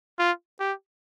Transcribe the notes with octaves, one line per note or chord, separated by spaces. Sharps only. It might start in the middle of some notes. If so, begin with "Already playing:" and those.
F4
G4